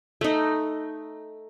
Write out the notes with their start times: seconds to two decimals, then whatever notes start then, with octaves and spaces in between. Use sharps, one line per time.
0.21 A3 D#4